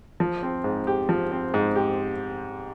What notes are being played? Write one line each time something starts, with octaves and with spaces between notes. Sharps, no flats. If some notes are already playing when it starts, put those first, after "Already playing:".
F3
C4
G#2
G4
F3
C4
G#2
G4